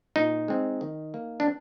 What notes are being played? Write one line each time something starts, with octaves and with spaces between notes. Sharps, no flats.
A#2 D#4
G#3 C4
D#3
A#3
D4